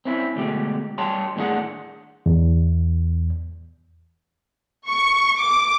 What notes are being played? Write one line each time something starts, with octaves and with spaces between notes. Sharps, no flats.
C4 C#4 E4
D2 B2 G#3 G4
G3 G4 C#5 G5 A5 C6
D#2 A2 C4 D4 G#4 F#5
E2
C#6
D6